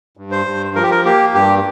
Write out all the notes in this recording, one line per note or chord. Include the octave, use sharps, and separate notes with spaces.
G2
C5
G2
F3 A#4
G4
A#4
A#3 G4
G2 G4